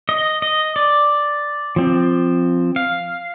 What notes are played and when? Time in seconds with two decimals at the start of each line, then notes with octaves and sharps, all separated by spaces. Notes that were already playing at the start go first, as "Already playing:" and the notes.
0.09 D#5
0.42 D#5
0.76 D5
1.76 F3 C4
2.76 F5